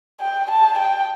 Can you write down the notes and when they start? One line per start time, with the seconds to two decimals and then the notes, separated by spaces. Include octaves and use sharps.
0.21 G5
0.50 A5
0.78 G5